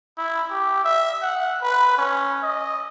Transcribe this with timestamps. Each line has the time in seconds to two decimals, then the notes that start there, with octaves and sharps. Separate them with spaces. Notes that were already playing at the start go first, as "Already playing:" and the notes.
0.18 E4
0.50 G4
0.84 E5
1.22 F#5
1.62 B4
1.97 C#4
2.43 D#5